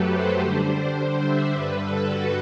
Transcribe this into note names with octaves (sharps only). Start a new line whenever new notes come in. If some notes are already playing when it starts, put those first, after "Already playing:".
Already playing: F#2 F#3 A3 G4 A4 B4
C5
D3 G3 D4
C5
E5
G2 D3 G3 B4
A4
F#4